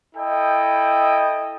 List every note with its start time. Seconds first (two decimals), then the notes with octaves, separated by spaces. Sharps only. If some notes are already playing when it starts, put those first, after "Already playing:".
0.15 E4 A4 D#5 G5